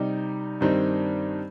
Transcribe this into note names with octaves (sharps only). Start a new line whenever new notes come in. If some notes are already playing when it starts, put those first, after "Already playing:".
Already playing: C3 G3 D#4
G2 D#3 G3 C4 D#4